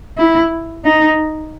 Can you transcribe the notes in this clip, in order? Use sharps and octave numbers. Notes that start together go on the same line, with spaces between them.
E4
D#4